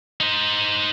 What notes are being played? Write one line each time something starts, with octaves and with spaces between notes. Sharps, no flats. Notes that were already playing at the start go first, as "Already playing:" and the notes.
D#4 C5